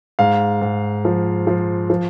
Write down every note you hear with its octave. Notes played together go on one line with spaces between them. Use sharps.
G#2 F5
G#2
F3
F3
F3